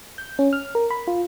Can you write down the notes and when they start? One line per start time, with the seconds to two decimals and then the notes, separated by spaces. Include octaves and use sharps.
0.18 G6
0.39 C#4
0.53 F6
0.75 A#4
0.90 B5
1.07 F4